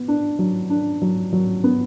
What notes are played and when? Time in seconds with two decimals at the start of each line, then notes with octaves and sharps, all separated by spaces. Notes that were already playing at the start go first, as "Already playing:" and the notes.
Already playing: B3
0.08 D4
0.39 F#3
0.70 D4
1.02 F#3
1.33 F#3
1.64 B3